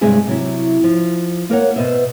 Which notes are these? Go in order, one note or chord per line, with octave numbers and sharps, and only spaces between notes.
G2 C3 G#3 C4 G#4 E5
C3 F#3 E4
F3
A#3 A#4 C#5 F#5
B2 B4 C5 D#5 E5